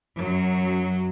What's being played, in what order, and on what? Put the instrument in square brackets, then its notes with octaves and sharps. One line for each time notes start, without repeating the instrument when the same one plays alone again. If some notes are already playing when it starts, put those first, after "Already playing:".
[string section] F#2 F#3